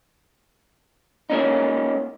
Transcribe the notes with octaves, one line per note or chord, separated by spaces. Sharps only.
A#3 C#4 D#4